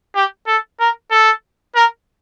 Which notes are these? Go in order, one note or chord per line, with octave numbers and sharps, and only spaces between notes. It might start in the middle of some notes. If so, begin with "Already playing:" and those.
G4
A4
A#4
A4
A#4